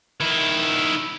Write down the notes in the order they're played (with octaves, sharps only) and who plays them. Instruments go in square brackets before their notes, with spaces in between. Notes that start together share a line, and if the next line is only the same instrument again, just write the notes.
[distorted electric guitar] D#3 E4